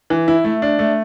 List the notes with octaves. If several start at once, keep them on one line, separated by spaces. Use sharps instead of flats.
E3
E4
A3
D4
A3